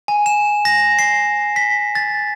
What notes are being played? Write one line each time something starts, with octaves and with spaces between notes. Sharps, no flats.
G#5
E7
A#6
C7
B6
A6